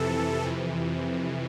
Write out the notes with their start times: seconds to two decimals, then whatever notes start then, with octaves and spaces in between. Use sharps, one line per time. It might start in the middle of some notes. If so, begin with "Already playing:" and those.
Already playing: F2 C3 E3 A4
0.42 F2 C3 E3